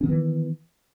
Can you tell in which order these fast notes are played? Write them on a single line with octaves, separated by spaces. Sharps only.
C#4 D#3 B3 E3